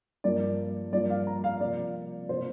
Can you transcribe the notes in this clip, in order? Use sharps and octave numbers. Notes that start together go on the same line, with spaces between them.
G2 F3 A#3 D5
G2 F3 A#3 D5
F5
A#5
F5
C3 F3 A#3 D5
C3 F3 A#3 C5